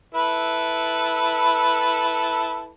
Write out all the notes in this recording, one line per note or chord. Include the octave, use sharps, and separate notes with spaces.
E4 A4 B4